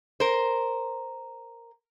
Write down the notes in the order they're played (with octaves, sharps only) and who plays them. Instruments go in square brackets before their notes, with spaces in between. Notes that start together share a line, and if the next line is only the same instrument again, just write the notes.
[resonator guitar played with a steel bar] A#4 C5